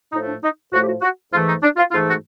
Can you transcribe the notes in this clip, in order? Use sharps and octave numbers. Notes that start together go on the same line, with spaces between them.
A2 F3 A3 D#4
D4
D#4
A2 F3 A3 F#4
G4
F#4
F#4
G#2 E3 A3 F4
D#4
D4
F4
G#2 E3 A3 F4
F#4